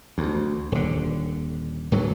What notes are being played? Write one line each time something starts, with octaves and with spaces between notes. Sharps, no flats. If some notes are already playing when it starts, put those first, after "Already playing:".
D2
D#1 D3
D1 G2 F#3